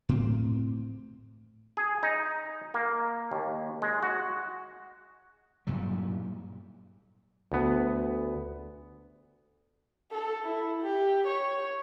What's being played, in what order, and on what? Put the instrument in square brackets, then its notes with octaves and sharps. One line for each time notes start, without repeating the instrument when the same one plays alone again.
[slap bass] A2 C4
[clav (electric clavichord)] G#4
D#4
A#3
D#2
G#3
F#4
[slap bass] G2 A#2 F#3 G3
[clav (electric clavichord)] D2 B3
[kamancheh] A4
E4
G4
C#5